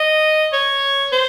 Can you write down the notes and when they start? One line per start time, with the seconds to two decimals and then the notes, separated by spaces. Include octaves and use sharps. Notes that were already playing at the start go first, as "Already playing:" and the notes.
Already playing: D#5
0.52 C#5
1.12 C5